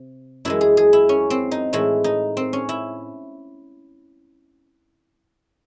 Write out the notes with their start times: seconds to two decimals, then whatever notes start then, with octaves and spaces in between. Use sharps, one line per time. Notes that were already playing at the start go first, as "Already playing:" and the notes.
Already playing: C3
0.45 F#2 E3 G#3 E4
0.61 G#4
0.77 G#4
0.93 E4
1.09 C#4
1.30 C4
1.51 D#4
1.73 A2 E3 G#3 E4
2.04 D#4
2.37 C4
2.53 C#4
2.69 E4